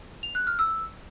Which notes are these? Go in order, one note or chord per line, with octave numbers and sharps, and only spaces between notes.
F7
F#6
F6
E6